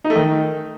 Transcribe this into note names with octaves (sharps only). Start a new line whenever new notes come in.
D#4
A3
D#3